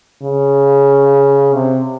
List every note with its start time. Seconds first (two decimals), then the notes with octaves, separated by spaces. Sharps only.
0.22 C#3
1.53 C3